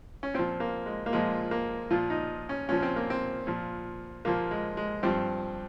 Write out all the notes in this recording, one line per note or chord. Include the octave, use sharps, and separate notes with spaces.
C#4
A#2 F3 C4
A#3
G#3
A#3
A#2 F3 G#3
A#3
A#2 F3 F4
D#4
C#4
A#2 F3 C#4
C4
A#3
C4
A#2 F3
A#2 F3 A#3
G#3
G#3
G2 F3 C4